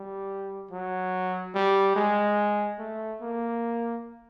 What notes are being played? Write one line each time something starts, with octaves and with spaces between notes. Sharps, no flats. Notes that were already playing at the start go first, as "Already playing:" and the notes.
Already playing: G3
F#3
G3
G#3
A3
A#3